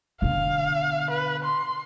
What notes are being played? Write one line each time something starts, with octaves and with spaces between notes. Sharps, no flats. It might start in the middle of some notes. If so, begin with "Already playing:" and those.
B2 D3 F5
B4
C6